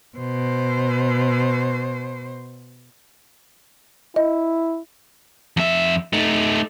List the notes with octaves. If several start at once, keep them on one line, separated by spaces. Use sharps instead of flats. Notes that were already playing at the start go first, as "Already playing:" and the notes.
B2 C5
E4 D#5
F2 E5
A3 D#4